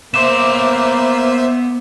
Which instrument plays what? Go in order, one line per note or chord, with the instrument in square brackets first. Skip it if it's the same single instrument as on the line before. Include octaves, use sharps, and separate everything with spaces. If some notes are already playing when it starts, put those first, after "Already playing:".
[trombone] A#3 [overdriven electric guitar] B3 C6 [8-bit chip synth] C5 E5 [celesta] D6 E7